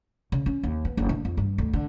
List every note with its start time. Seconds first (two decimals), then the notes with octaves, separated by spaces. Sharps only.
0.32 C#3
0.46 C#4
0.63 D#2
0.85 B3
0.97 F#1
1.09 D3
1.25 F2
1.37 G2
1.58 D2
1.73 D3